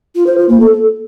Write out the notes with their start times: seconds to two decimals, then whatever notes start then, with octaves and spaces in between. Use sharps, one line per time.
0.15 F4
0.27 C5
0.38 F4
0.49 A#3
0.60 A4